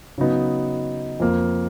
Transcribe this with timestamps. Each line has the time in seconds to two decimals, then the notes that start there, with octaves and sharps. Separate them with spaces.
0.18 C#3 F#3 B3 D#4
1.20 F2 F3 A#3